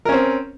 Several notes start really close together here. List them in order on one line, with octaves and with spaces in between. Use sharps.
A#4 C#4 C4